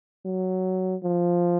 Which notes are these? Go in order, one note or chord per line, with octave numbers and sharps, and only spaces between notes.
F#3
F3